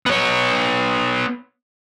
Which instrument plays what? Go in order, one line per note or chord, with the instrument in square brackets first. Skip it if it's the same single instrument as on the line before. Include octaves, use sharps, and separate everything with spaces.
[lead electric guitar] B3 C#5